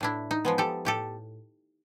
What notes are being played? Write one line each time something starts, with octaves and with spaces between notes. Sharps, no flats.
A2 D4 E4
D#4
F3 G#3 B3
G4 A4
A2 G4 A4